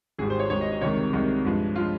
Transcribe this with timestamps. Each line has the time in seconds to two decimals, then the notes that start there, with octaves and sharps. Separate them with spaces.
0.19 G#1 G#2 G3 G#4
0.30 C5
0.39 C#5
0.50 G#1 G#2 G3 C#5
0.61 D#5
0.72 D#5
0.81 C2 C3 D#3 G#3 C#5
1.13 C2 C3 D#3 G#3
1.45 G2 F3 G#3
1.76 F3 G#3 F4